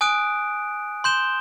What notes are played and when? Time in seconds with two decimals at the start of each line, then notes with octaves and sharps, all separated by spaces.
0.01 G#5 D#6 F#6 D7
1.04 C6 G6 E7 G7